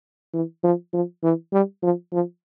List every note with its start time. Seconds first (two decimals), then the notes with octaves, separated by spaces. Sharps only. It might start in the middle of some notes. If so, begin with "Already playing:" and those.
0.34 E3
0.64 F3
0.93 F3
1.23 E3
1.53 G3
1.83 F3
2.12 F3